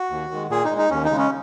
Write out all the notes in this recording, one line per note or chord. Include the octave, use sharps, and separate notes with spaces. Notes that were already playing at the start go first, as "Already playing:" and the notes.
Already playing: F#4
D#2
D#3 G#3
A#2 G#4
D#4
G#3
D#4
D#2 C#4
D#4
C#3 G#3
C#4